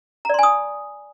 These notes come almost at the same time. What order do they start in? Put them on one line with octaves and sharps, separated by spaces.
A#5 D5 C6 G#5 D#6